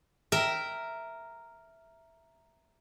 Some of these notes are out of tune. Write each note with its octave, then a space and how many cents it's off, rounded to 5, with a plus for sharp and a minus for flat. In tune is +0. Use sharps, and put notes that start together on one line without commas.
A#4 -5 E5 +0 G5 +0